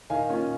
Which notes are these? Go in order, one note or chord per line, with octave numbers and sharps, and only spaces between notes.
D#3 F5 G#5
A#3 C#4 F4